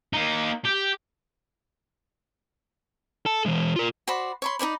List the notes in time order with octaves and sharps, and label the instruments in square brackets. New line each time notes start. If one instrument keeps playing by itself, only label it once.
[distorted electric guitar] A#3 D#4
G4
[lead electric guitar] A4 A5
E3 G#3
F4 A#4
[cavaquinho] F#4 C5 D5 B5
C#5 B5 C6
D#4 C#5 D5 B5